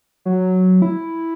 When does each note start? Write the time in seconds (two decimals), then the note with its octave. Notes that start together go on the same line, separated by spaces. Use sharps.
0.26 F#3
0.82 E4